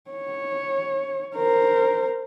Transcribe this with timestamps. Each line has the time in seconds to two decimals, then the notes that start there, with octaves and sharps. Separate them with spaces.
0.11 C#5
1.36 A#4 C5